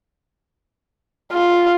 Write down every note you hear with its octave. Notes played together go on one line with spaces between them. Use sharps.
F4